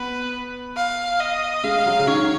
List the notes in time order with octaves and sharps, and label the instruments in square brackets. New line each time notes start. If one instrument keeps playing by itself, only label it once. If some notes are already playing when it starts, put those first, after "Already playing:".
Already playing: [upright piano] B3 [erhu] B4
[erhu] F5
D#5
[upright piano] G#3 [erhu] F5
[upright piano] F#3
C#3
[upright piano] D#3 [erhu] C#5